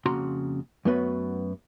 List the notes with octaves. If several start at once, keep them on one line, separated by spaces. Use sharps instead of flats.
F2 C#3 A#3 F#4 A#5 C6
F#2 A3 B3 F#4 B4